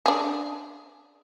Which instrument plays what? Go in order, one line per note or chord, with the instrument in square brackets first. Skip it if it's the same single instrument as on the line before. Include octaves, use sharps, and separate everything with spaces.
[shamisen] D4 G#4